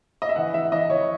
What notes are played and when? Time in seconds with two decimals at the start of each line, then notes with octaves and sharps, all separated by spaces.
0.22 D#5
0.29 E5
0.36 E3 F#5
0.54 E3 E5
0.72 E3 D#5
0.90 E3 C#5